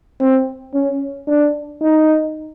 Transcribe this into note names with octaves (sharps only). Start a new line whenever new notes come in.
C4
C#4
D4
D#4